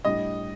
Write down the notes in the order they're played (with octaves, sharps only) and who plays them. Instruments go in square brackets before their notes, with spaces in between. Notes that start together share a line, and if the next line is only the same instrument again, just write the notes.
[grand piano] A2 G3 D4 [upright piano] D#5